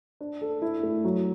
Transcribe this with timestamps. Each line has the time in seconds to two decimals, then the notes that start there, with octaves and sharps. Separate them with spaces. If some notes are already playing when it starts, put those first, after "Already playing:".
0.21 D4
0.41 A4
0.62 E4
0.83 A3
1.05 F#3